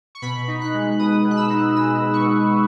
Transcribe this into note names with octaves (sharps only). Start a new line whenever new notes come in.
C#6
B2 B5
D#4
F#6
G#3
B2 D#6
B2
F#6
E6
D#4
G#3 E6
B2
C#6
B2